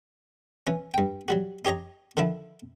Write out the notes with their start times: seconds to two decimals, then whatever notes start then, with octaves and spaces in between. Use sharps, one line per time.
0.67 E3 C#4
0.94 G2 G5
1.28 F#3 G3 F#4
1.65 D#4 G4 C#5 D#5 A#5
2.17 D3 D#3 F3 E4